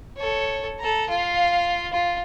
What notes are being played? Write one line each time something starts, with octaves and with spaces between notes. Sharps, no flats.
A4 C#5
A4 A#5
F4 F5
F4